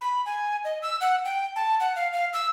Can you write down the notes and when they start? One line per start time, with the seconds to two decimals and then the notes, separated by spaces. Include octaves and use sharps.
0.01 B5
0.26 G#5
0.65 D#5
0.82 E6
1.01 F#5
1.25 G5
1.56 A5
1.80 F#5
1.96 F5
2.13 F5
2.33 E6